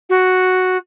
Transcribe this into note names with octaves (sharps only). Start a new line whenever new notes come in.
F#4